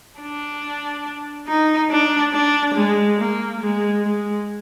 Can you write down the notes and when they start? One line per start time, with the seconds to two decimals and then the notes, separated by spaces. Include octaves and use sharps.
0.20 D4
1.48 D#4
1.90 D4
2.33 D4
2.75 G#3
3.19 A#3
3.61 G#3
4.03 G#3